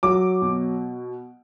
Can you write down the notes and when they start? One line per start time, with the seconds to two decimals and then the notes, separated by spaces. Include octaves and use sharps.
0.03 F#3 D6
0.42 B2